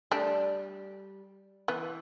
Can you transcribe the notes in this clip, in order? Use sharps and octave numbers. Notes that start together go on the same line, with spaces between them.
G3 A3 D4
E3 B3